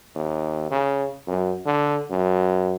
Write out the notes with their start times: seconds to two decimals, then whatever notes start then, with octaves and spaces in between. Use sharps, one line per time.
0.15 D#2
0.71 C#3
1.28 F#2
1.66 D3
2.11 F#2